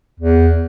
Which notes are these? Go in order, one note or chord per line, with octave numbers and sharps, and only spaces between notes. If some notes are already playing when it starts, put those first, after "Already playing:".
E2